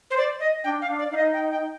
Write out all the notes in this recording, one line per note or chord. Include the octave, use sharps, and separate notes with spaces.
C5
D5
D#5
D4 G5
F5
D4
D5
D#4 F5
D#5
G5
G5